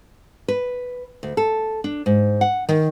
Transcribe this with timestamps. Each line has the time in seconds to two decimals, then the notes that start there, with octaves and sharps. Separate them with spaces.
0.48 B4
1.23 D2
1.37 A4
1.84 D4
2.06 G#2
2.41 F#5
2.69 D#3